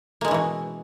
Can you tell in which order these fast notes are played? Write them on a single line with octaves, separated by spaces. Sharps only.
A#3 G#3 C#4 E3 B2